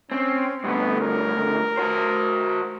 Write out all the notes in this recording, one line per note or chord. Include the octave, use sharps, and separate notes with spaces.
C4 C#4
D2 G2 B3
A#4
F#4 C5